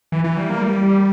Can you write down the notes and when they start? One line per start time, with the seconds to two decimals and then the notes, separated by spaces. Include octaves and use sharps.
0.12 E3
0.24 E3
0.37 G3
0.49 A#3
0.62 G3